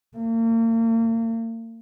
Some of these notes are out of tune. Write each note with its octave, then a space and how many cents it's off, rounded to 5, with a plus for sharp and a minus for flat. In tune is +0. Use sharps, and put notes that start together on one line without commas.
A#3 -40